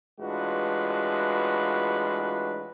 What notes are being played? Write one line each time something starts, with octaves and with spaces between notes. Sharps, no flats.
A1 G#3 D4 F4 F#4 B4